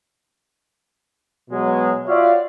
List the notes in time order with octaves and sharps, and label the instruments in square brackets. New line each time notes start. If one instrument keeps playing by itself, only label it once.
[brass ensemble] B2 F#3 G#3
F4 F#4 C#5 D5 E5 F5